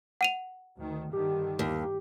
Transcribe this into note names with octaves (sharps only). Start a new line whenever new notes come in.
F#5 D#7 F7
D2 D#3
G2 D3 D#3 G4
D#2